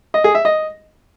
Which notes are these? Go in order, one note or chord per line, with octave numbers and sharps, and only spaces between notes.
D#5
G#4
E5
D#5